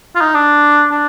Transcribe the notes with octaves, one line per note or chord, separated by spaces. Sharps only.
F4
D#4
D4
D4